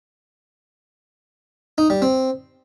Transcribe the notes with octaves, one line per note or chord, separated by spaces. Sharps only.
D#4
G3
C4